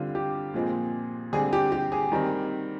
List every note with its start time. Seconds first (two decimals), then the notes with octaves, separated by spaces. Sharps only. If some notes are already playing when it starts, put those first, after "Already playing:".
Already playing: D3 G3 C4 F4
0.15 G4
0.54 A#2 F3 G#3 C4
1.33 D3 G3 C4 G#4
1.53 G4
1.72 G4
1.92 G#4
2.12 D#3 G3 C4